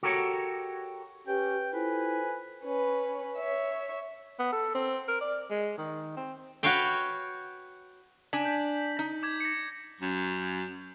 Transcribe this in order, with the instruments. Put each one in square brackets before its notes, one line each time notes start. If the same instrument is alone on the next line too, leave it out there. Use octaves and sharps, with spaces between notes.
[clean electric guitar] F#4 G4 A4 A#4 C#5
[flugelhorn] C#4 [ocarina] G4 [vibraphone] B4 [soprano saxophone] G5
[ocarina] E4 [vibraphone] F4 A4 C5 [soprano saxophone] B4 [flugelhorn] G#5
[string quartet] C#4 B4
C#5 E5
[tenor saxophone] B3
A4
C4
A#4
D5
G#3
D#3
C4
[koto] F#4 B4 C#5 F5 G5
[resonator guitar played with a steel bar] D4 G#5 [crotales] B6 F#7
[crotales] G6 B6
[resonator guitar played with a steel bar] D#4
[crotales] D6 G#6
A#6 C#7
[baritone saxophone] F#2